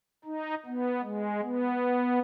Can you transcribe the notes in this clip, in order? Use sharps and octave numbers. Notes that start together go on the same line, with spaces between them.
D#4
B3
G#3
B3